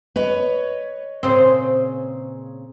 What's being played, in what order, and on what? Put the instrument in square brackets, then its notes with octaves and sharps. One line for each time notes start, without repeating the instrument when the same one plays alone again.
[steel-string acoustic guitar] B4 C#5 D#5
[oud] A#2 C#3 C5 [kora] C4